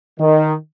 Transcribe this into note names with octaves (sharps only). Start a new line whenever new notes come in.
D#3